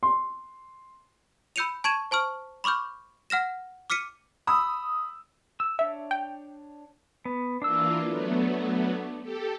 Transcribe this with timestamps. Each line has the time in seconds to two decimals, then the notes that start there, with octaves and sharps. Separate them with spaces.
0.03 C6
1.56 B5 E6 G6 C#7 D#7 F7
1.84 A5 C#6 G#6 D#7 E7
2.11 C5 A5 C#6 F6
2.64 B5 C#6 D6 F6 G6
3.30 F#5 F6 A#6 E7
3.90 D6 F6 B6 C#7 D#7
4.47 B5 D#6 E6
5.60 E6
5.79 D4 C#5 E5
6.11 G5
7.25 B3
7.62 E3 A#3 D4 F4 E6
8.06 F#3 A3 B3
9.23 G4 A4